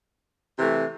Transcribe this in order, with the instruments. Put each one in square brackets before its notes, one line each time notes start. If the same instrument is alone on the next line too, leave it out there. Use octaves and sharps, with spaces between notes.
[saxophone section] C3 E3 A3